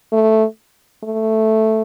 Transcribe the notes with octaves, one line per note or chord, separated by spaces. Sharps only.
A3
A3